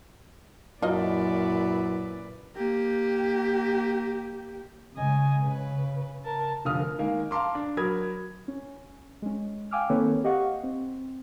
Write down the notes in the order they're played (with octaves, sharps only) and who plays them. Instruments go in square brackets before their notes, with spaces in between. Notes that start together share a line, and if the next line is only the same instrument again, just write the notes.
[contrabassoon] F#2 [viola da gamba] A#2 B4 D5 [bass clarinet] E4 [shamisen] F4 A#4 D#5
[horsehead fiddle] A#3 G4
[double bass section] C#3 G#3 [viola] D#5 G#5
[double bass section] C#3 [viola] B4
[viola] A#4 A5
[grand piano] F1 D3 F4 D#6 F6
A#4
D#3 G#3 A#3
F5 A5 A#5 C6 D6
D4
F#3 A#4 B5 D#6 G#6
[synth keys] C#4
G#3 C#4
F5 G5 G#5 D6 E6 F6
D#3 A#3 C4 A4 B4 C#5
G4 D#5 F5 F#5 C#6
C4